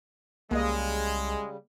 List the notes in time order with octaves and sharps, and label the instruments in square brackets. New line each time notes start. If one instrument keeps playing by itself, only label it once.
[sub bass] C2 [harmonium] C#3 G3 [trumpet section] G#3 [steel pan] A#3 D#5